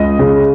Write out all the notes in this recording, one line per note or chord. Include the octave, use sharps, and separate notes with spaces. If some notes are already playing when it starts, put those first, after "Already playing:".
Already playing: C#2 D#5
C#3